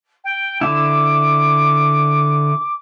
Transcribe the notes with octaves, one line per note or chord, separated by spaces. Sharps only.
G5
D3 E4 D6